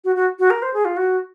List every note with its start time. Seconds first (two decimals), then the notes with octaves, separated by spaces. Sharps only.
0.04 F#4
0.16 F#4
0.39 F#4
0.50 A#4
0.62 C5
0.74 G#4
0.85 F4
0.97 F#4